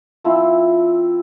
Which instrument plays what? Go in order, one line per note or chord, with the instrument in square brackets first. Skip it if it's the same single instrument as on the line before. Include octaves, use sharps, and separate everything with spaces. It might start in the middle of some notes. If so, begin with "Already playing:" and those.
[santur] F3 C4 E4